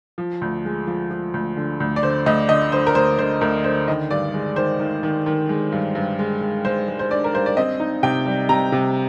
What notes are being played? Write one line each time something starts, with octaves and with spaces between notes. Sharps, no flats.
F3
D2
G#3
F3
F3
D2
D3
D2
D5
D3 C5
D2 D#5
D3 D#5
D3 C5
A#4
D2 C5
D3 C5
D2 A#4
D3 C5
D#3 D#5
G2 D5
G#3
D#3 C5
D#3
D#3
D#3
G#3
G2
G2
G#3
G#3
G#3 C5
G#3
C5
D4 D5
A#4
G2 C5
D5
C4 D#5
D#4
C3 G5
G3
C3 A#5
C3